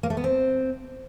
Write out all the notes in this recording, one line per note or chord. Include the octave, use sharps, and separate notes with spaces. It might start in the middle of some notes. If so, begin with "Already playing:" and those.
A#3
A3
B3
C4